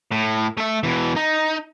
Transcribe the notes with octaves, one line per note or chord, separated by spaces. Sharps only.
A2
A3 E5
B2 E3
D#4